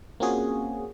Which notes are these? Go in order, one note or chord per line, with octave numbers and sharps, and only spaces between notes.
A#3 C4 C#4 F4 F#4 G#4